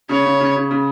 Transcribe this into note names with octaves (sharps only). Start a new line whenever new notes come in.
C#3 C#5
C#3
C#3
C#3
C#3